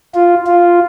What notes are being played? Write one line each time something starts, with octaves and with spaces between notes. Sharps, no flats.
F4
F4